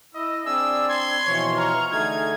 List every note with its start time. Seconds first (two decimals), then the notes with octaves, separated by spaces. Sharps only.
0.15 E4 D#5 E6
0.46 C4 D4 G#4 D5 E6
0.89 C6 G#6
1.26 B2 E3 F3 C#5
1.58 A#5 C#6 F6
1.91 D3 A3 D#4 G#4 G#6